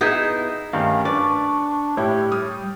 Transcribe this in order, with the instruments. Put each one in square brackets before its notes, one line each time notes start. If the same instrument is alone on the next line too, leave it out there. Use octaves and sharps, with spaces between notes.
[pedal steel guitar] B3 E4 G6 [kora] D#4 G#4 E5
[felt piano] G2 D#3 A3 [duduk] C#4 [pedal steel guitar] F5
[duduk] D4 [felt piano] B4 [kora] D5 [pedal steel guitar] C#6
[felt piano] A2 E4 [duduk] G4 [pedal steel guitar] C#5
[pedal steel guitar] G3 [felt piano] D#6 F6